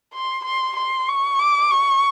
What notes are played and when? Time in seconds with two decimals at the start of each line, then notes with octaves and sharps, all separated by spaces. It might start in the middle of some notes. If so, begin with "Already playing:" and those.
0.14 C6
0.45 C6
0.76 C6
1.08 C#6
1.39 D6
1.71 C#6